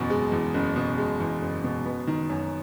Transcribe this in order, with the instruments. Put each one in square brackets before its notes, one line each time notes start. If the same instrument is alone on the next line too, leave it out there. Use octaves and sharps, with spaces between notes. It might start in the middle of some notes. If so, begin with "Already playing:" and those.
Already playing: [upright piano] F#1 E2 B2
G#3
E2
F#1
B2
G#3
E2
F#1
B2
B3
D#3
F#2